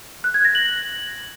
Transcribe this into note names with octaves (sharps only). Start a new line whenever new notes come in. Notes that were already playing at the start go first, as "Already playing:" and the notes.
F#6
G#6
A#6
F#7